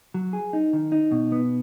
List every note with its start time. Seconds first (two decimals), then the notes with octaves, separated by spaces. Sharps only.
0.14 F#3
0.33 G#4
0.53 D#4
0.73 D#3
0.92 D#4
1.12 B2
1.32 B3